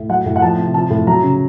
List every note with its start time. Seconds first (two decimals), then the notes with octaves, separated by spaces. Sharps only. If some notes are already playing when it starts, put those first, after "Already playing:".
Already playing: A2
0.09 F#3 F#5
0.26 A2
0.36 F#5
0.42 F3 A5
0.58 C3
0.74 F3 A5
0.90 A2
1.07 F#3 A#5
1.23 C#3